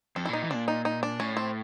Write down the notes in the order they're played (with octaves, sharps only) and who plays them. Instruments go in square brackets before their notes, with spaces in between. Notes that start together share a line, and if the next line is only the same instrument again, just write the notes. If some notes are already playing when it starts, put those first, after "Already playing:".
[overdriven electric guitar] F2 [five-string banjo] A4
[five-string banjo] E4
[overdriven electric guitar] A#2 [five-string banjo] D#4
[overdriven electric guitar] E3
[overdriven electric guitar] A#2 [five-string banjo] D4
[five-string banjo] D#4
D#4
D4
[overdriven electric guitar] A2 [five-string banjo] C#4
[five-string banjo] C4